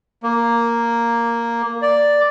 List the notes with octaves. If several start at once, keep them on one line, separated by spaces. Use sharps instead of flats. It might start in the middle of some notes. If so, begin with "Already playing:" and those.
A#3
D5